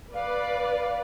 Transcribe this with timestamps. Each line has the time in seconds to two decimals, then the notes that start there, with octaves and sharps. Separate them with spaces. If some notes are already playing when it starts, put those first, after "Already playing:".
0.14 B4 D5 F5